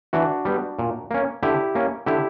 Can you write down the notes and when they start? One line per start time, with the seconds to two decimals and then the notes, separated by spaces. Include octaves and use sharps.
0.13 E3 D4 F#4
0.45 G3 B3
0.79 A#2
1.11 A#3 C#4
1.43 D3 E4 G4
1.75 A#3 C#4
2.06 D3 E4 G4